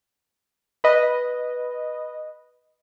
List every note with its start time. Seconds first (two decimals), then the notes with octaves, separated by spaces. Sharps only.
0.84 B4 D#5